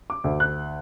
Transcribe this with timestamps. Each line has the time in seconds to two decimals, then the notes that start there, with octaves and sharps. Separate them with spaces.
0.10 D6
0.24 D2
0.40 F#6